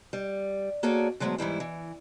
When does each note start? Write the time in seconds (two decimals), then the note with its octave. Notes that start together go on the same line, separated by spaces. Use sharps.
0.13 G3
0.83 A#3 F#4 G#4 A4 C#5 D5
1.20 D3 F#3 G#3 A3 B3 C5
1.38 G#2 E3 G3 E4
1.60 E3